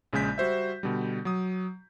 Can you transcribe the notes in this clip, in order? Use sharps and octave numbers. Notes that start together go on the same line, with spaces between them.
A#1 C#3 G#3 G#5 G6 B6
G3 F#4 C5 E5
B2 D3 G3
F#3 D#6